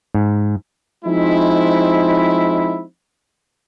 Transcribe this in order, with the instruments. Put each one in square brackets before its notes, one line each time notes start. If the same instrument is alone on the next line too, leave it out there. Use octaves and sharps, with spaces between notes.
[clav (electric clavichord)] G#2
[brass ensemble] F3 G#3 C4 D#4 E4